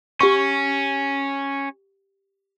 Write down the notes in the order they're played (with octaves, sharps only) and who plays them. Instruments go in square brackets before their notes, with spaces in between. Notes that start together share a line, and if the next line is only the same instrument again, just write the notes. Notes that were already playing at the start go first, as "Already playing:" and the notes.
[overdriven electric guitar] C#4 [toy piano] G4 F#5 C#6